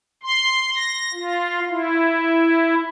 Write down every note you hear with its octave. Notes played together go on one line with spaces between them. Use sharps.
C6
A#6
F4
E4